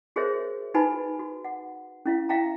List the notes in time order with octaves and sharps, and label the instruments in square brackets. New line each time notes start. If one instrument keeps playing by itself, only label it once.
[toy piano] F#4 G#4 A#4 C5 C#5 E5
D#4 F#4 B4 G#5 B5
F#4
F#5
C#4 E4 F5
E5 F5 G5 A#5